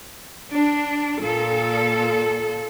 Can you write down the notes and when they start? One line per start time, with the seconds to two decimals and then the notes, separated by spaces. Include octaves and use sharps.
0.51 D4
1.19 A#2 A4